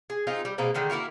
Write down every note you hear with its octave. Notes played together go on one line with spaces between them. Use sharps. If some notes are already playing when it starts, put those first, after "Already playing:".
G#4
C4 D#4 F4 G#4
G3
B2 G#3 A#3 C4
D3 D#3 G#3 A3
A#3 E4 F#4 A#4